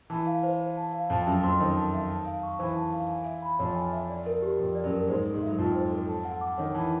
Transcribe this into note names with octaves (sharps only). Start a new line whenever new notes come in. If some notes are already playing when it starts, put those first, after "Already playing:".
E3 A5
F5
C5
C5
A5
F5
F2 F3 A5
F#2 F#3 E5
F2 F3 C6
D#3 C5
A5
E5
A5
F5
C#6
E3 C5
A5
F5
G#5
E5
B5
F2 F3 C#5
G#5
E5
D5
A#4
G4
F2 F3 G4
D5
F#2 F#3
A#4
G#2 G#3 C5
A4
G#2 G#3
F#3 E5
F2 F3 F4
C5
A4
A5
F#5
D6
D#3 C#5
E3 A5